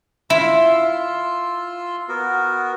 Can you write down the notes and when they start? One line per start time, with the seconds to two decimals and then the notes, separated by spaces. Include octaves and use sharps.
0.30 E4 F4 C6 E6
2.09 B3 F#4 A#4